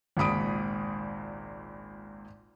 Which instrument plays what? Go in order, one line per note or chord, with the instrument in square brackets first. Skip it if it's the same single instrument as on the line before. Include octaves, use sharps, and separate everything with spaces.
[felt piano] G#1 C#2 A#2 B5 D#6 D7